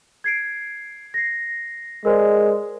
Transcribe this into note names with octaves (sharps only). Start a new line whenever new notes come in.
G#6 C7 D7
A#6 C7
G#3 A#4 C5 D5